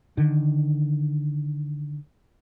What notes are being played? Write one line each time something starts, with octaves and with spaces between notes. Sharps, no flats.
D3 D#3